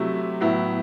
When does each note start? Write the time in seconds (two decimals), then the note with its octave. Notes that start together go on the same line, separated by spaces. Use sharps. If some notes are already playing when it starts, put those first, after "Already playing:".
Already playing: C3 F#3 A3 E4
0.40 A2 F#3 B3 E4